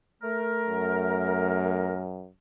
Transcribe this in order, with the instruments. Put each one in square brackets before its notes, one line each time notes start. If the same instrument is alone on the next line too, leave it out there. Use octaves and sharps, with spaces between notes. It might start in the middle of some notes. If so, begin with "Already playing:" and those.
[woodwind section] A3 A#4
[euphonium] F#2